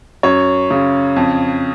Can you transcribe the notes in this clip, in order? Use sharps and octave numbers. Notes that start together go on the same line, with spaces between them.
F#2 C#5
C#3
F2